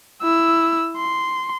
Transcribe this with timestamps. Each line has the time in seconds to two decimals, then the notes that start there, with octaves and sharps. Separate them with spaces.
0.22 E4 E6
0.97 C6